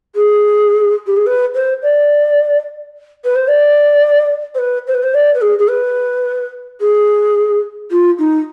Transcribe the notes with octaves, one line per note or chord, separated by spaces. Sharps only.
G#4
G4
G#4
B4
C5
D5
B4
C5
D5
C5
B4
C5
B4
C5
D5
B4
G#4
G#4
B4
G#4
F4
D#4